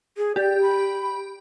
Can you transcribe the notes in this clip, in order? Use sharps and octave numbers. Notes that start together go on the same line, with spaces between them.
G#4
G4 D5
B5